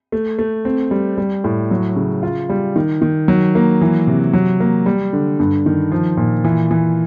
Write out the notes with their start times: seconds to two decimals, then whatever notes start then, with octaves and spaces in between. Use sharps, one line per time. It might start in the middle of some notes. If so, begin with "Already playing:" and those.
0.12 A3
0.39 A3
0.65 C4
0.91 G3
1.18 G3
1.44 A2
1.71 F#3
1.96 C#3
2.23 F4
2.49 G3
2.76 D#3
3.02 D#3
3.28 F#3
3.55 A#3
3.81 E3
4.07 C3
4.33 F#3
4.60 A#3
4.86 G3
5.13 D3
5.39 G2
5.66 D#3
5.92 F3
6.17 A#2
6.44 E3
6.71 E3